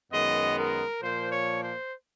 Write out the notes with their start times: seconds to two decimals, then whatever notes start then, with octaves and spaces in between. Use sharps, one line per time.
0.11 F#2 D#3 G#3 B3 D#5
0.57 A#4
1.02 A#2 F3 A#3 C5
1.31 C#5
1.62 C5